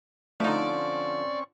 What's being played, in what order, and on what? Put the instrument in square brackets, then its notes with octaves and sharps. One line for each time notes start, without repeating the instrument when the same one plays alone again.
[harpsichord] D3 F3 [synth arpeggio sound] A3 D#4 [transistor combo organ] C4 C#4 C#6 [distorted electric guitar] D5